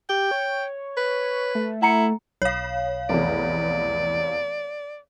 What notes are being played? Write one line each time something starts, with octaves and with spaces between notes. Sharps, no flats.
G4 G5
C#5
B4
A3
E4 F#5 A#5 C#7
B1 C#5 F5
F1 E2 D5